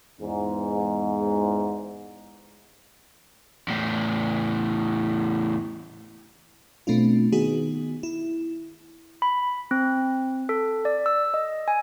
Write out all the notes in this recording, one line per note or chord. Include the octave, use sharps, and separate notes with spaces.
E2 G#2
E2 A2
B2 A3 C4 D4 F4
D#3 B3 D#4 F#4 G#4
E4
B5
C4
A4
D5
E6
D#5
G#5